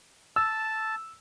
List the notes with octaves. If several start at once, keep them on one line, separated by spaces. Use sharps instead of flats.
A5 E6